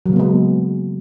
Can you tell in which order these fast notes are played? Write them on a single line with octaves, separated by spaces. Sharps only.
F#3 C#3 A#3 B3 G#3